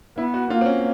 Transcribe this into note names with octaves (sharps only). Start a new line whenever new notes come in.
B3 E4
F#4
A#3 F4
C4
C#4